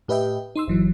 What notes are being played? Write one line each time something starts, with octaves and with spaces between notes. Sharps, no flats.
A2 G4 B4 D#5 E5 G5
D#4 C6 E6
G1 E3 F#3